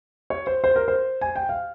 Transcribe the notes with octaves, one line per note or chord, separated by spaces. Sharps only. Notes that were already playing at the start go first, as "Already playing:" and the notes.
C#5
C5
C5
A#4
C5
G#5
G5
F5